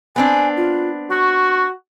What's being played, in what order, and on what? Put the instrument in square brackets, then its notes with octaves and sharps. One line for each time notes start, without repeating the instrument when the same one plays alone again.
[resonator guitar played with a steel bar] B3 C4 D4 [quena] G#5
[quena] F4
[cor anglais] F#4 [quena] C#6